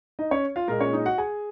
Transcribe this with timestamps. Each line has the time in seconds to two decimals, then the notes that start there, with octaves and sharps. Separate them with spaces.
0.19 D#4 D#5
0.31 C#4 C#5
0.56 F4 F5
0.68 A#2 G#3 A#3 A#4
0.80 C#4 C#5
0.93 D#4 D#5
1.05 F#4 F#5
1.18 G#4 G#5